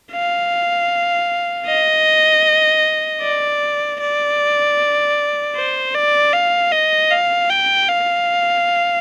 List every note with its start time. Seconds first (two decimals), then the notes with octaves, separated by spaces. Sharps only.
0.12 F5
1.67 D#5
3.21 D5
4.00 D5
5.55 C5
5.94 D5
6.33 F5
6.72 D#5
7.11 F5
7.50 G5
7.88 F5